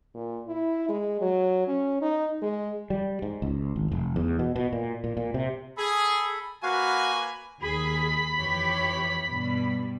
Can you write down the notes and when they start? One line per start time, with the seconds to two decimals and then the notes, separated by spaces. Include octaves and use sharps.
0.15 A#2
0.48 E4
0.89 G#3
1.21 F#3
1.68 C#4
2.02 D#4
2.42 G#3
2.90 G3
3.22 G#2
3.42 C#2
3.76 G#1
3.92 F1
4.16 E2
4.39 B2
4.56 B2
4.73 A#2
5.04 A#2
5.17 A#2
5.34 C3
5.77 G#4 A4 B5
6.63 A#3 F#4 B4 F5 G#5
7.61 D#2 G#4 B5
8.37 F2 E3 G4 C#5
9.29 G2 B2 G3